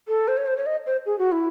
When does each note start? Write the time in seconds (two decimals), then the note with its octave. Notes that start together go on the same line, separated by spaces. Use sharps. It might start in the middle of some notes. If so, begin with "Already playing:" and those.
0.08 A4
0.28 C5
0.37 C#5
0.46 C5
0.57 C#5
0.66 D#5
0.86 C5
1.06 G#4
1.19 F#4
1.32 E4